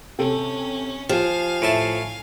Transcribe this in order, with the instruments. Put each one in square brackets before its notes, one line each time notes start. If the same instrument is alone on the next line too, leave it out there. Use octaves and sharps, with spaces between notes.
[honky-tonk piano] C3 G4 A4 [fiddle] C#4
[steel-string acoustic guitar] F3 [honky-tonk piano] G4 [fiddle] F5 G#5
[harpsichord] A2 E5 A5